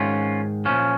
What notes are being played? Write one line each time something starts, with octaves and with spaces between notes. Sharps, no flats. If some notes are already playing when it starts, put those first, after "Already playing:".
Already playing: G#2 D#3 C#4 F4
A#2 F3 C#4